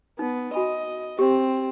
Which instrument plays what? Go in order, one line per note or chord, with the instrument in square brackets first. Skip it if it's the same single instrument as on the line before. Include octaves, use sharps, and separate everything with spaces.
[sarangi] B3 [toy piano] D#4
[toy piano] F#4 G#5 B5 [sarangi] D#5
[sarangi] C4 [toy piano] G4